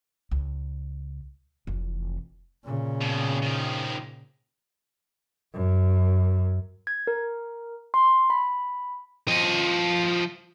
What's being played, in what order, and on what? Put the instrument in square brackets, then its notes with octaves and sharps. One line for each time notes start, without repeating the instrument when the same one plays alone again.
[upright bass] C#2
F1 E3
[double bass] A#2 C#3
[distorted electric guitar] F2 B2
D#3 F3
[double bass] F#2
[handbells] G#6
A#4
C6
B5
[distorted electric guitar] F3 D#5